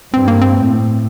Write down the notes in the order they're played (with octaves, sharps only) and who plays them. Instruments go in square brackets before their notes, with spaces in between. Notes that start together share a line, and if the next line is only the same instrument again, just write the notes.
[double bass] G2 [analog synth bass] C4
[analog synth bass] A#3
C4
[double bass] A2